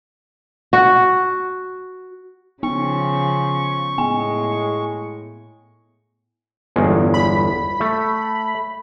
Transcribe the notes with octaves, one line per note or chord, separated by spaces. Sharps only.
F#4
C#3 F3 B3 C#6
A2 G#3 B3 G#5
G1 E2 G#3
B5
A3